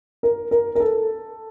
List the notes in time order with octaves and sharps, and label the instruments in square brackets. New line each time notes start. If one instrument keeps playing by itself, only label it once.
[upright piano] A#4
A#4
A#4
A4